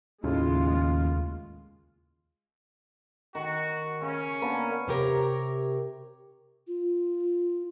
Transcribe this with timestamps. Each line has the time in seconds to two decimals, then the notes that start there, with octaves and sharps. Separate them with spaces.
0.24 D#2 A2 C#3 G#3 F4
3.35 D#3 F#4
4.02 C#3 C#4
4.42 A#3 B3 D4
4.88 C3 G4 A#4 C#5
6.67 F4